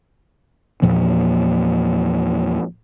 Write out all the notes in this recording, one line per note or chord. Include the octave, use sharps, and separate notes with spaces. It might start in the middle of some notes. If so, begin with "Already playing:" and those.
E2 A#2 F3 A#3